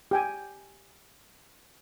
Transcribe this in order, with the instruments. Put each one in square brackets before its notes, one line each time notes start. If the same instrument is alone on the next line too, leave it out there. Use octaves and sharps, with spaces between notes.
[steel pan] G4 G5 G#5